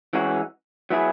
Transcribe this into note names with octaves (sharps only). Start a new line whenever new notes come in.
E3 G#3 C#4 F#4
F#3 B3 E4 G#4